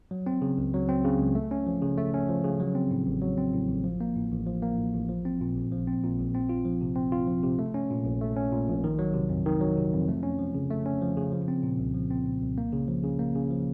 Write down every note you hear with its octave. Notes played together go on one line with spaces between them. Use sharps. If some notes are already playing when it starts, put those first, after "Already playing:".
F#3
C4
C#3
C#2
F#3
C4
C#3
C#2
A3
C#4
F3
C#3
A3
C#4
F3
C#3
F#3
C4
A2
A1
F#3
C4
A2
A1
F3
A#3
A2
A1
F3
A#3
A2
A1
F3
C4
A#2
A#1
F3
C4
A#2
A#1
C4
F4
F3
C3
C4
F4
F3
C3
A3
C#4
A#2
A#1
A3
C#4
A#2
A#1
D#3
F#3
C3
F2
D#3
F#3
C3
F2
A3
C#4
F3
C#3
A3
C#4
F3
C#3
F3
C4
A#2
C2
F3
C4
A#2
C2
A#3
C#3
F3
C#3
A#3
C#3
F3